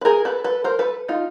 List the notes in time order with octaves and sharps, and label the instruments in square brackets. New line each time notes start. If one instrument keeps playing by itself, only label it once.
[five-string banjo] B4
G#4 A#4
A4 B4
A4 B4
A#4 C5
A4 B4
D#4 F4